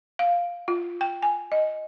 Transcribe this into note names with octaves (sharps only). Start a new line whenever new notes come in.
F5
F4
G5
G#5
D#5